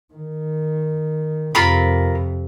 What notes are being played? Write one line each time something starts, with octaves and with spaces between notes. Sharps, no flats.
D#3
F2 C3 F4 A#4 B5